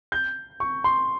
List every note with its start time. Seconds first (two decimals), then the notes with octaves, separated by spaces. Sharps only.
0.12 G6
0.60 C#6
0.84 C6